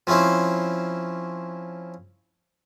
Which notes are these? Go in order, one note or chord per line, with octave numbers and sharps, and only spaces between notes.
F3 C4 C#4 E4 C5